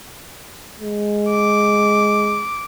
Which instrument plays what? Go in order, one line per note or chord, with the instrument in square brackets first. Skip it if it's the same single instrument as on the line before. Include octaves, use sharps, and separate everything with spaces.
[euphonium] G#3
[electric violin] D6